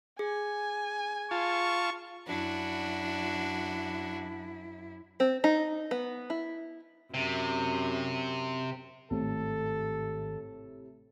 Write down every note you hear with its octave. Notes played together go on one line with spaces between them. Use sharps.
G#4 G#5
F4 A5 C#6
F#2 D4 E4 F#4
C4
D#4
B3
E4
F#2 C3
G#1 A2 C3 A4